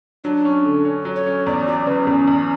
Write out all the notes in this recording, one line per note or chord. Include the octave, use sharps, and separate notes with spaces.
F#3 D4
C#4
D3
C#4
F#3
C#5
C#4
E2 D5
F#3 D5
C#3 B4
E2 C#4
E2